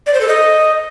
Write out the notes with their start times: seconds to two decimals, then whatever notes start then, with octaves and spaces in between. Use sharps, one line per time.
0.06 D5
0.14 C5
0.21 A4
0.28 D#5